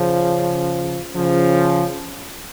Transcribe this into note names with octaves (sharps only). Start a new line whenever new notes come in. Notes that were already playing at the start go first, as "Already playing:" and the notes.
Already playing: C#3 F3
C#3 F3